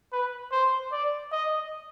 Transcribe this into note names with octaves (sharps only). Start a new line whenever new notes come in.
B4
C5
D5
D#5